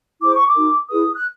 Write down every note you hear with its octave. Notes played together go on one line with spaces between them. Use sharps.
E4 G#4 C5 D6
C#6
D6
D#4 F#4 A#4
E4 G#4 B4 D#6
F#6